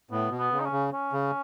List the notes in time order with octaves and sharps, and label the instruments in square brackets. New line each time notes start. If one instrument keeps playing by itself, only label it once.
[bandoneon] A2 [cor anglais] B3
[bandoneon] B2
[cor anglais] B3
[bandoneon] C#3
[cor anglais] D#4
C#4
[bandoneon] C#3
[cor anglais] C#4
[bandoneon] C#3